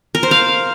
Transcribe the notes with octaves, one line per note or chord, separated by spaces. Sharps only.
A#4
C5
F5